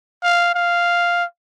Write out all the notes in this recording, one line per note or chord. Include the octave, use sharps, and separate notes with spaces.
F5
F5